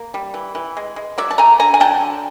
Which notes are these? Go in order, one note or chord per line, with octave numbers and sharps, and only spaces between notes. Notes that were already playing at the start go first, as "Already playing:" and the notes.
Already playing: A#3
G3
E3
E3
G#3
G#3
F#3 D5 E5
A5
A3 G#5 A#5
D3 G#5 A#5
G#5
F#3 G5 A5
D3